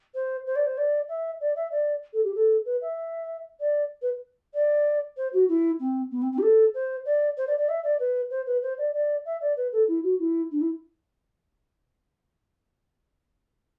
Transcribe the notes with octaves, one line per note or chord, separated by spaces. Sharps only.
C5
C5
D5
C5
D5
E5
D5
E5
D5
A4
G4
A4
B4
E5
D5
B4
D5
C5
F#4
E4
C4
B3
C4
C4
G4
A4
C5
D5
C5
D5
D5
E5
D5
B4
C5
B4
C5
D5
D5
E5
D5
B4
A4
E4
F#4
E4
D4
E4